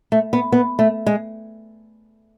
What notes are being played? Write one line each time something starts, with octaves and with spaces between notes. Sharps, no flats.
A3
B3
B3
A3
G#3